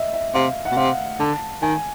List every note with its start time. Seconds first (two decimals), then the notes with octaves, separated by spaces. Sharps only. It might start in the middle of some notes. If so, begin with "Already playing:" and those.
Already playing: D#5 E5
0.13 E5
0.35 C3 F5
0.65 F#5
0.71 B2
0.77 C3 F5
1.20 D3 A5
1.62 D#3 G#5